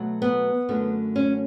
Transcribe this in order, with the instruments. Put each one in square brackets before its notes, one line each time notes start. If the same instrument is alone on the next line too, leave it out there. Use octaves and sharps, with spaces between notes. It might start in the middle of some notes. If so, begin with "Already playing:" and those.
Already playing: [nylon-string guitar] B2 F#3 A3
B3
F#2 D3 A3
C#4